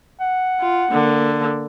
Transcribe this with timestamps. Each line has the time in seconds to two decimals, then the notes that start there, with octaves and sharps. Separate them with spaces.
0.20 F#5
0.60 F4
0.91 D3 A#3